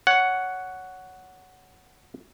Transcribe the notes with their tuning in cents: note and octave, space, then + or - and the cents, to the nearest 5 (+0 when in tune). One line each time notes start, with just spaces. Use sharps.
C#5 +10 F#5 +0